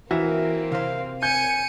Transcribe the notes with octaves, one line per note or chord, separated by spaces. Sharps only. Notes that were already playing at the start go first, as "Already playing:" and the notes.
E3 A#3 C4 F#4 A#4 E5
C3 C5 F5
G#5 G6 C#7 D#7